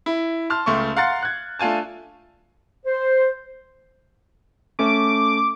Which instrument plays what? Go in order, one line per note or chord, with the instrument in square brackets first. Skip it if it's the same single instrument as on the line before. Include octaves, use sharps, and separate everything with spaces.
[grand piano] E4
A5 C6 F6
C#2 A3 C6 C#6
F5 F#5 A#5 C6 A6 C#7
F#6 G#6
A3 D4 F4 G#5 A5
[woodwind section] C5
[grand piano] A3 C#4 [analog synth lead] D6